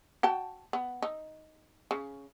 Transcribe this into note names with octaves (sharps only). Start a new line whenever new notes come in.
F#4 G5 A5
B3
D#4
C#3